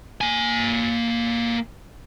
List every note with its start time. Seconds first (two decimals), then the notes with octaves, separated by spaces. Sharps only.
0.21 A#3 G#5